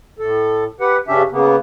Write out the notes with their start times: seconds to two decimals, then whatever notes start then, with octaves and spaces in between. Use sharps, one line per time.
0.19 A2 A4
0.80 G4 B4 F#5
1.08 G2 C#3 C#4 D4 G4 E5
1.31 C#3 A#3 B3